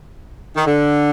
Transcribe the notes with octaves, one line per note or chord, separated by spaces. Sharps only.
D#3
D3